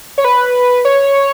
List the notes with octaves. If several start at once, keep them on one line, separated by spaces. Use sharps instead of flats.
C#5
B4
C#5